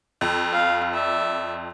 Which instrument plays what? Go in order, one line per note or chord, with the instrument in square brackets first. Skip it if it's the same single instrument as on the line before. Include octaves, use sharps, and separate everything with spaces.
[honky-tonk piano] F2
[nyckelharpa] F5
D5 E5